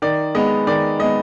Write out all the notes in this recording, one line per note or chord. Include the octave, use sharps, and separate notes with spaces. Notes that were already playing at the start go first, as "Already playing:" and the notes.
D#3 D5
G#3 B3 D#5
D#3 D5
G#3 B3 D#5